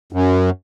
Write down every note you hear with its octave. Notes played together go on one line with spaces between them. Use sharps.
F#2